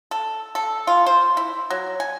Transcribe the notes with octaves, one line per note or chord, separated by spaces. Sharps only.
A4
A4
F4
C5
E4
F#3
G#5